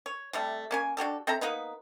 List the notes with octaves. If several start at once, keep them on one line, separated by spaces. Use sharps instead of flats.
C#5
C3 G3 A3
A#3 C#4 G#5
D4 F#4 G4 A4
C4 A4 E5 A#5
A#3 B3 D#4 B4